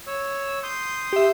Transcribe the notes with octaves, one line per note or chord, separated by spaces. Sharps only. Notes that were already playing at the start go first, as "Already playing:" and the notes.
C#5 E6
C6 D#6 G6
G4 E5